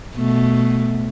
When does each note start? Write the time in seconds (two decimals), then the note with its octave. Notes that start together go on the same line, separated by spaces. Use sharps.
0.15 B2 A3